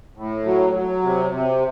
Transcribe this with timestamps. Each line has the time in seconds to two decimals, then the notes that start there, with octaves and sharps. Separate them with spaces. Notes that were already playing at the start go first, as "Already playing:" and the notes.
0.17 A2
0.45 F#3
0.73 F#3
1.02 C3
1.31 C3